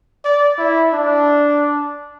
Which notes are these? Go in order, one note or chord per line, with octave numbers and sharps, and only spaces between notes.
D5
E4
D4